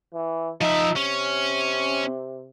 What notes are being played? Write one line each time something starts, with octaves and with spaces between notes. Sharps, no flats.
E3
F3 D#4 E5
C3 C#4